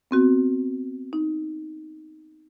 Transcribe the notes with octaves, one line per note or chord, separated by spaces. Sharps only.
B3 C4 F#4
D#4